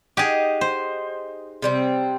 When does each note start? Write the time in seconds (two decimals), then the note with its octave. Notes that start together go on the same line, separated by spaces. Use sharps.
0.17 D#4 G4 G#4 F#5
0.61 C5
1.62 C3 G3 C4